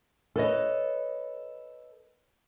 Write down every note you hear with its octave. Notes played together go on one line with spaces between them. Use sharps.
A4 B4 C#5 D#5